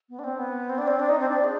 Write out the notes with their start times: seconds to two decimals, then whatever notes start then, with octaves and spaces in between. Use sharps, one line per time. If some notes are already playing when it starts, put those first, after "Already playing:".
0.09 B3
0.19 D4
0.24 C4
0.39 B3
0.69 C4
0.78 D4
0.87 C4
0.99 D4
1.09 D#4
1.19 C4
1.30 D4
1.44 G#4